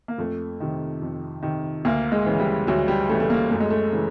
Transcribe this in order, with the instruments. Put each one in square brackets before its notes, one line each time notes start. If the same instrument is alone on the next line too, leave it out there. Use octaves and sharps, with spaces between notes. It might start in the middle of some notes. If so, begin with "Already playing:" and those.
[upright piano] A#3
F2 A3
C3 D#3
F2
C3 D#3
D2 A#3
G#3
C#3 E3
G3
D2 F#3
G3
C#3 E3 A3
A3
A#3
F#2 A3
G#3
A3
C#3 E3